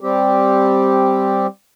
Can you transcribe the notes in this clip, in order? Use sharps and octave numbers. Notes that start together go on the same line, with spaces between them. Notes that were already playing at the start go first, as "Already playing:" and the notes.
G3 C4 G4